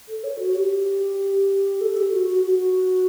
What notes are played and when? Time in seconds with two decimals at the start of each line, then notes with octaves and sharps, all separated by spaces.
0.08 A4
0.24 C#5
0.39 F#4
0.55 G4
1.81 A4
1.97 G4
2.12 F#4
2.29 F#4
2.44 F#4